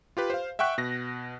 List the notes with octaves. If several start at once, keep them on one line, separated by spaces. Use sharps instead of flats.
F4 G4 B4
C5 F5
E5 F#5 G5 C#6 F#6 B6
B2 A#6